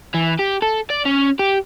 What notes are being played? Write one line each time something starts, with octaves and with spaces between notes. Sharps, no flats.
E3
G4
A4
D5
C#4
G4